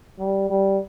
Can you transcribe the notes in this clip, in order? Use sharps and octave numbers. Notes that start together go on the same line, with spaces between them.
G3
G3